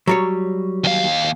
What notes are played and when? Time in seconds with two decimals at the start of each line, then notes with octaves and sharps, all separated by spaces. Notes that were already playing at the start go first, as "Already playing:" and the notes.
0.07 F#3 G3 C#5
0.84 D#2 F5